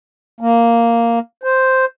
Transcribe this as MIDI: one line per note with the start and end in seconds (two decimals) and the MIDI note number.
0.41 1.19 58
1.43 1.85 72